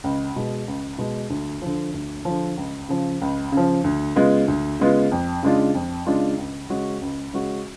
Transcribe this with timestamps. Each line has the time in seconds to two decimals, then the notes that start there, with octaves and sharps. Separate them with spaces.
0.04 C#2
0.36 B2 G#3
0.68 C#2
0.98 B2 G#3
1.30 D2
1.62 D3 F3
1.94 D2
2.25 D3 F3
2.57 C#2
2.89 C#3 F3
3.21 C#2
3.52 C#3 F3
3.84 D2
4.15 C#3 G#3 B3 F4
4.48 D2
4.79 C#3 G#3 B3 F4
5.11 F2
5.43 C#3 G#3 D4 F4
5.74 F2
6.06 C#3 G#3 D4 F4
6.38 C#2
6.70 C#3 G#3 C#4 F#4
7.01 C#2
7.33 C#3 G#3 C#4 F#4